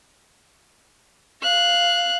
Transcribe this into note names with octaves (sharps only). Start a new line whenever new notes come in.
F5 F#6